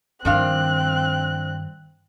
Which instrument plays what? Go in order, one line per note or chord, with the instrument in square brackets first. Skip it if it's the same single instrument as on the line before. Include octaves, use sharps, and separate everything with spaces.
[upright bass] G2 D#3 [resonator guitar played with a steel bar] F3 D4 F5 [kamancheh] C4 F#6